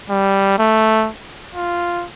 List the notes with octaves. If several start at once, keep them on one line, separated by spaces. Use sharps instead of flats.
G3
A3
F4